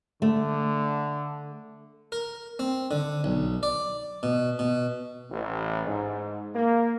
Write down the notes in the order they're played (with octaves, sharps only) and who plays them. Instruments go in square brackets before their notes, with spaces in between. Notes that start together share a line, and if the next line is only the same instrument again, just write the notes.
[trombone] D3 [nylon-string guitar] A3
[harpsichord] A#4
C4
D3
B1
D5
B2
B2
[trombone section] A1
G#2
A#3